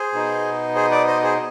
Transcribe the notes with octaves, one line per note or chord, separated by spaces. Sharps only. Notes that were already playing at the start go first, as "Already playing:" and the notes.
Already playing: G#4 C5
B2 B3 D#4
G#4 C5
B4 D5
C5 D#5
G#4 C5